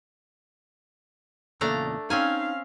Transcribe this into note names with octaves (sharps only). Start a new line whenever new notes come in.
E2 A#2 C#3 A3 D4 A#5
C4 C#4 D#4 F5 G#5 A5